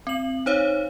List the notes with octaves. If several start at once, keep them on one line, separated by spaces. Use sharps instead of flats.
C4 F#7
D#4 C5 C#5 F5